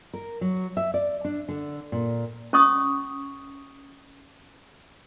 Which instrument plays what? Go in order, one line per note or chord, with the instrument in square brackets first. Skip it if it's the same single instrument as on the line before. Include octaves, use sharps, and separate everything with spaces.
[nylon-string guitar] A#4
F#3
E5
D5
D4
D3
A#2
[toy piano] C#4 C#6 D#6